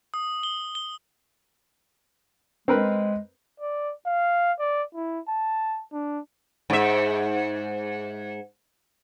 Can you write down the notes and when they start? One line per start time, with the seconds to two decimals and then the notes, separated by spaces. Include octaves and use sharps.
0.14 D#6
0.43 G7
0.75 G7
2.68 G#3 C4 A#4 B4
3.60 D5
4.06 F5
4.60 D5
4.95 E4
5.28 A5
5.92 D4
6.70 G#2 E5